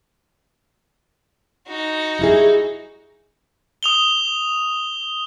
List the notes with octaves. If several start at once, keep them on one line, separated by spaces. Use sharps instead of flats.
D#4 F#4
G3 E4 G#4
D#6 F7 G7